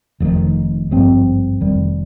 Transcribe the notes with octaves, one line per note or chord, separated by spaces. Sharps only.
F1 F2 D#3
G#1 G2 F3 C4
F1 F2 D#3 G3